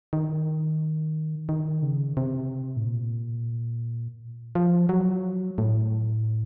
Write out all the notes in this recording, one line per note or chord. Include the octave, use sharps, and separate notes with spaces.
D#3
D#3
C#3
C3
A2
A#2
F3
F#3
A2